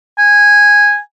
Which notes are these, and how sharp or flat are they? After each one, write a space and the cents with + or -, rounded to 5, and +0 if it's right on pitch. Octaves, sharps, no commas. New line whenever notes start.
G#5 -10